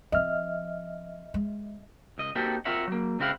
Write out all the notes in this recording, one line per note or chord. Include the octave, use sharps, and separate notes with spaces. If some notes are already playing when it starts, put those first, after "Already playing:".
F3 C4 D#5 E5 F6
G#3
C#2 D#5
A#3 C4 D#4 F#4 G4 A4
C4 F4 A#4 C#5 E5 F#5
F#3 A#3
C#2 C#3 C4 E4 F5 F#5